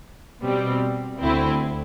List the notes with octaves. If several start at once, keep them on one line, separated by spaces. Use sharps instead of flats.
B2 G3 C4
D2 D3 A3 C4 E4